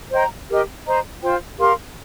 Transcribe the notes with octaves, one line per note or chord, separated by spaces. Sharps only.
C5 D#5 G5 A#5
G4 A#4 D#5
C5 D#5 A#5
F4 C5 G5
G4 A#4 F5 C6